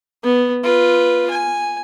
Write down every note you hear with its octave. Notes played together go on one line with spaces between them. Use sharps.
B3
F4 B4
G#5